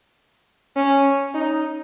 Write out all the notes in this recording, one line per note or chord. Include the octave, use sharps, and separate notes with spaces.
C#4
D#4